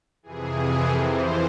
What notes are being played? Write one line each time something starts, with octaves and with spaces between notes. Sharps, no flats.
F2 C3 E3 G#4
F2 E3 C5